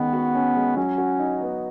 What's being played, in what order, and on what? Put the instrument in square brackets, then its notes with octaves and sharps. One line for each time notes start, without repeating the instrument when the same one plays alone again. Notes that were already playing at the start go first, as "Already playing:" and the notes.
Already playing: [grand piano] D#3 G#3 C#4 [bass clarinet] B3
[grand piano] F#4
C#4
G#3
[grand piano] F#3 [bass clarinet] C#4
[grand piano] F#4
D#4
B3